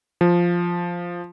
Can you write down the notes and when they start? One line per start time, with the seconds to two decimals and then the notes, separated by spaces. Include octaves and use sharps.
0.21 F3